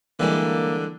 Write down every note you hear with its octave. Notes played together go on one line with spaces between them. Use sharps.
D3 E3 G3 G#3 A#3